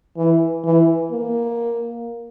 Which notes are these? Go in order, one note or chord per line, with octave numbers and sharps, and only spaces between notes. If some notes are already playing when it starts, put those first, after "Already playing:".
E3
E3
A#3